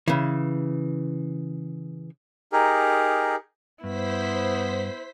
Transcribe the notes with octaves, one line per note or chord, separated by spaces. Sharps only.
C#3 E3
D#4 G4 G#4 A#4
G2 B3 E4 C5 B6